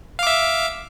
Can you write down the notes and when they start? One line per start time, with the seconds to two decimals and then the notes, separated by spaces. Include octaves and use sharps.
0.19 F5
0.23 D6
0.27 E5